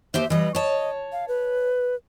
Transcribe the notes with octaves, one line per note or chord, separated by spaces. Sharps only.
D#2 G4 C5 E5
E3 G3 D#5
C#5 D#5 A5
F5
B4